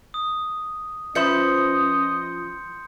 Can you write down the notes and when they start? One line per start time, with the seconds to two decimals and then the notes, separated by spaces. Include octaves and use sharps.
0.14 D#6
1.15 F3 C#4 B4 D#5 E5 C6 G6 C#7